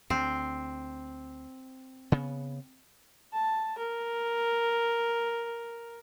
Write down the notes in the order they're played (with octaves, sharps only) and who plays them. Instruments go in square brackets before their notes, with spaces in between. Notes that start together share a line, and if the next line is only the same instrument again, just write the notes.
[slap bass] D2 [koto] C4
[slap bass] C#3 B3
[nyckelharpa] A5
A#4